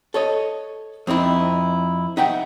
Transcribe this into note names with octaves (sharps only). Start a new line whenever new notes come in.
A4 C#5 D#5
F2 C4 D#4 E4
D#4 E5 F#5 G5